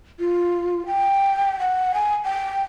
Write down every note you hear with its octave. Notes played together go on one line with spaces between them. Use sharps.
F4
G5
F#5
G#5
G5